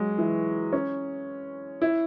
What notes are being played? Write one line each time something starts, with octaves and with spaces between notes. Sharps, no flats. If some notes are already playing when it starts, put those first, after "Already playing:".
Already playing: F#3 G#3
E3
C#4
E4